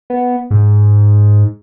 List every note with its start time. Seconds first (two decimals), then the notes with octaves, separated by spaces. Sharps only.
0.10 B3
0.51 G#2